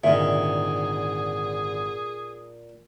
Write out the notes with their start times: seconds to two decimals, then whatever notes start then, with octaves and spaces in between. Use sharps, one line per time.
0.04 G#1 A#2 D3 D#4 G#4 A#4 E5